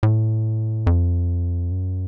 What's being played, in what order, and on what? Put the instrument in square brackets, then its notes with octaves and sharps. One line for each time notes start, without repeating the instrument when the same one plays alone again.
[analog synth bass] A2
F2
F#2